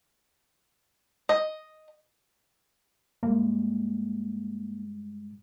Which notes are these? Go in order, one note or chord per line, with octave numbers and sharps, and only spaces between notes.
D#5
G2 G3 G#3 A#3